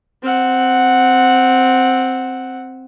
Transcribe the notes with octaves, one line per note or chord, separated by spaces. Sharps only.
C4 F#5